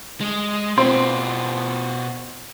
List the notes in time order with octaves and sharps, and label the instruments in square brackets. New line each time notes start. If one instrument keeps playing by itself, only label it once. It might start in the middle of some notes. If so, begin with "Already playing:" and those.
[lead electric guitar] G#3
[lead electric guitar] B2 F4 [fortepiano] C4